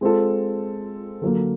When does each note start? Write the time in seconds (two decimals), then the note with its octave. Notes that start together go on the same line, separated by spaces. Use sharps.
0.01 G#3 C4 F4 A4
1.22 D3 F#3 A#3